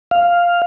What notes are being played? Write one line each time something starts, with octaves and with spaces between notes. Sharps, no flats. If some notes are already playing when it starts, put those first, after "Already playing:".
F5